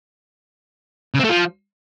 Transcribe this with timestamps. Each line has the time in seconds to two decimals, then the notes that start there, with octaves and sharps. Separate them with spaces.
1.14 C#3
1.19 C4
1.24 A3
1.29 F3